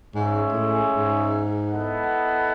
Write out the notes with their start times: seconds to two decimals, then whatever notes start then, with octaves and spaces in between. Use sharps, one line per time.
0.14 G#2 G#3 C#4 G#4 C#5 E5
0.53 A2
0.93 G#2
1.70 B3 E4 A4 D#5 F#5